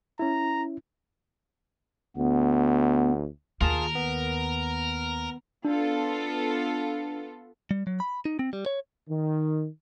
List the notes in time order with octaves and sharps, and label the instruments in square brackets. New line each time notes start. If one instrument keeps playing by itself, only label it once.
[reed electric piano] C#4 E4 [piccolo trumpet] A#5
[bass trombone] D2 [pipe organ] B3
[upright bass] D#2 [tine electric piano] F4 G#4 A5 [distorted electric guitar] A#4
[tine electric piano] B3
[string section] B3 F4 A4 [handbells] D4
[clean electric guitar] G3
F#3
B5
D#4
C4
G3
C#5
[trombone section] D#3